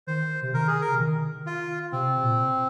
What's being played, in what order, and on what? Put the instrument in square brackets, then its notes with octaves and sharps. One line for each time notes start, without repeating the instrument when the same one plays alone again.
[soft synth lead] D#3 [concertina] C5
[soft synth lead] C3
[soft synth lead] D#3 [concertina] A#4
[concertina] G#4
A#4
[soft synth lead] C3
D#3
[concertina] F4
[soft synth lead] C3 [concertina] C4
[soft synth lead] C3
A#2